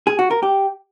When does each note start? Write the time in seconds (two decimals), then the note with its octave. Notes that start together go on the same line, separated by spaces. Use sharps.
0.07 G#4
0.19 F#4
0.31 A#4
0.43 G4